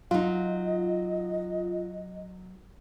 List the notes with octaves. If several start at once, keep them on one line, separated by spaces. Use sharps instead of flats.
F#3 D#4 F4 D#5